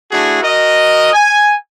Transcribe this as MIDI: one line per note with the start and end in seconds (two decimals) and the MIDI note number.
0.12 0.42 57
0.12 0.42 62
0.12 0.42 64
0.12 0.42 66
0.12 0.42 68
0.43 1.13 66
0.43 1.13 70
0.43 1.13 75
1.13 1.54 80